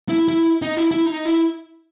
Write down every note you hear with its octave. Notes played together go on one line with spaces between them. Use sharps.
E4
E4
D#4
E4
E4
D#4
E4